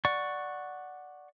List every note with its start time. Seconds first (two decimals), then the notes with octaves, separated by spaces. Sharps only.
0.05 D5 F#5 C#6